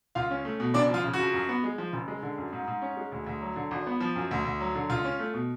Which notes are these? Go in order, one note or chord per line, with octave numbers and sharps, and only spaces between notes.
C#2 F4 F5
C#4
A3
B2
F#1 D4 D5
F3 F4
C#3
F#4
F2
F#2
B3
G#3
F3
F#1
G#3
D3
F#2
G#2
G#2
C#4
G#3
D2
D2
F#3
D3
G#1
B3
F3
F#2
D2
D2
F#3
D3
C#2 F4
C#4
A3
B2